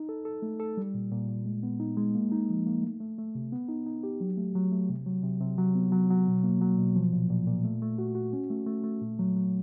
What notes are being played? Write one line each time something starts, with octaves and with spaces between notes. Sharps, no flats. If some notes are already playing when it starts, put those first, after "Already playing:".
Already playing: D#4
A4
A4
A3
A4
G3
A#2
A#2
A#2
G#3
B3
D#4
G#3
A#3
D#4
F3
A#3
A3
A3
A3
C3
B3
D#4
D#4
G4
F#3
A3
F#3
A3
C3
F#3
C3
C3
F#3
B3
F#3
F#3
B2
A#3
F#3
B2
F3
A#2
A#2
A#2
A3
A3
F#4
F#4
C#4
A3
A3
A3
A#2
F#3
F#3